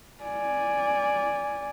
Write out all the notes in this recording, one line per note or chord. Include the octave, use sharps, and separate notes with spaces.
D5 G#5